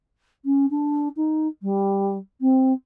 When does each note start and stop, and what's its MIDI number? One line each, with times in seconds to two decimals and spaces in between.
0.45 0.66 61
0.70 1.08 62
1.16 1.47 63
1.62 2.17 55
2.41 2.73 60